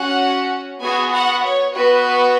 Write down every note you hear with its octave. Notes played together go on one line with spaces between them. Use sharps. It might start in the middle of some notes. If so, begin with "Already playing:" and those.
Already playing: C#4 F#4 F#5
B3 F#4 G#4 G#5
F#4 F#5
C#5
B3 F#4 B4